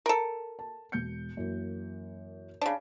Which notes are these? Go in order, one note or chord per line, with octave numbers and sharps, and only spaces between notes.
A4 A#4
A5
E1 G6 C#7
F#2 E3 A#3
C#3 D4